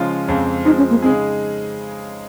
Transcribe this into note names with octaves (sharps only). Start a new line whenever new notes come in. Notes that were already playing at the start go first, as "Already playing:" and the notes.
Already playing: C#3 F3 G#3 C#4 F4
F2 C#3 G#3 C4
F3 G#3 C4 D#4
C#4
A#3
C#3 G#3 C4 D#4 G#4